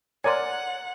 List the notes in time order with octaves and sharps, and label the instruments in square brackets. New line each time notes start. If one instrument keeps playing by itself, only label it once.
[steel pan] A#4 D5 G#5 [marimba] C#5 A#5 C6 [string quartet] F#5